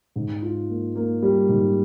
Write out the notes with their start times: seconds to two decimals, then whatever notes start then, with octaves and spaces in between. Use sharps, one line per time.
0.16 G#2
0.42 F4
0.69 A#3
0.95 A#3
1.22 G3
1.49 G#2